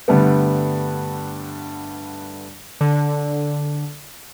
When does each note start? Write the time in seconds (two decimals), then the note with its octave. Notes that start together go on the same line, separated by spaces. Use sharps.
0.08 G2 D3 G3 A3 B3
2.81 D3